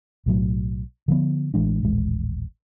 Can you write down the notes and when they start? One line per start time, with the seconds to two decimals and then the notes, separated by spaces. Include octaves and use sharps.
0.26 B1 A2 F#3
1.08 D3 F3 B3
1.54 A1 E3 G#3 D4
1.83 D#1 A1 G#3